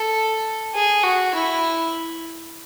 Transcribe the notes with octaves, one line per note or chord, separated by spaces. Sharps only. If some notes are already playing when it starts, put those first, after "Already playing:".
Already playing: A4
G#4
F#4
E4